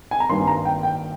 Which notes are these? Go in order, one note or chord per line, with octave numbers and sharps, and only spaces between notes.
G#5
A#5
G#1 G2 G3 A#3 C6
A#5
G5
G5